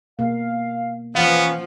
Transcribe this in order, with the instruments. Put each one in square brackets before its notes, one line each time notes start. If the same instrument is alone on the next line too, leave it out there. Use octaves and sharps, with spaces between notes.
[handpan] B2 A#3 [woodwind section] F5
[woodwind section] E3 C#4 [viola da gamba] F3 [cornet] B3 [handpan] F5 F#5